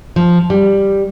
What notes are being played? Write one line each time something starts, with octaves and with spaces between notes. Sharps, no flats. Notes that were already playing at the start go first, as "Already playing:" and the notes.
F3
G3